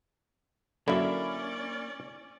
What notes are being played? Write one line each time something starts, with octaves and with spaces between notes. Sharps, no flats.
F#2 D3 A#3 C#4 D4 E4 D5 E5